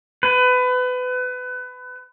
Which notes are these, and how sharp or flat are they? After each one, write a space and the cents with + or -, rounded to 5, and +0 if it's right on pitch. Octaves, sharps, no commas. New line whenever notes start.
B4 +25